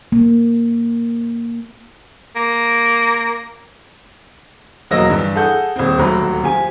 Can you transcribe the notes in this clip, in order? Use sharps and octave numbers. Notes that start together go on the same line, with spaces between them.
A#3
A#3
E1 F#3 A#3 D#5 E6 A#6
G2 E3
G#4 A4 F#5 G6
D#1 C4
D#1 D2 F#3 B5
F3 G4 G#5